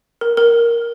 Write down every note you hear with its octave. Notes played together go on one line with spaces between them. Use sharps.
A#4
A#4